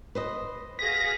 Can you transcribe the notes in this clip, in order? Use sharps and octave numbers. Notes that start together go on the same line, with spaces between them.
B4 C5 D#5
F#4 G#4 F5 A#6 B6